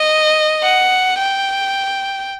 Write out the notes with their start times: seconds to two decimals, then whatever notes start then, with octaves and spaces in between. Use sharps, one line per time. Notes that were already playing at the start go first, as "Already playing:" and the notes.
Already playing: D#5
0.63 F#5
1.18 G5